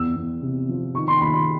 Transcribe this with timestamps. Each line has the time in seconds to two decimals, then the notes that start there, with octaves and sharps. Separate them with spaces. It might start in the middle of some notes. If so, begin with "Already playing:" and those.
Already playing: E2 E6
0.16 E2
0.42 C3
0.69 F3
0.95 D#3 C#6
1.08 C6
1.21 D#2 B5
1.34 C6